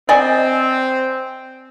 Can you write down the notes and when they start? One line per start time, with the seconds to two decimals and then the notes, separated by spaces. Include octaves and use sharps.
0.09 C4 D5 D#5 G#5